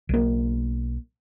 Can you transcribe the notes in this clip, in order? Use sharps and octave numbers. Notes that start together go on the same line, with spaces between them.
B1 A#3